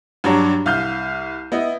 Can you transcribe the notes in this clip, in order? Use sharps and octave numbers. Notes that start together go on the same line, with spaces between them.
G2 F#3 D4 C#5 A#5
C2 F5 F6 G6
B3 E4 D#5